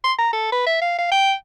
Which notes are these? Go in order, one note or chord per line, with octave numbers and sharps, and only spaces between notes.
C6
A#5
A4
B4
E5
F5
F5
G5